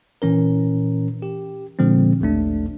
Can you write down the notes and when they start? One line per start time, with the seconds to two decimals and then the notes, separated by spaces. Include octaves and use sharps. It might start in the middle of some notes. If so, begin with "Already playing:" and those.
0.22 A#2 E3 C#4 A#4
1.22 G4
1.79 A#2 D3 F3 G#3 C4
2.21 A1 D#2 A3 D4